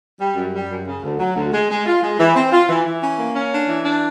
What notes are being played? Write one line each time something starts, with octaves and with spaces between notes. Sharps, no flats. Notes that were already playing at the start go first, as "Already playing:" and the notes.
G3
F#2
G3
F#2
C#3
D2
F#3
D2
G#3
G#3
F4
G#3
E3
C4
F4
E3
E3
C#4
A#3
C#4
D4
E3
D4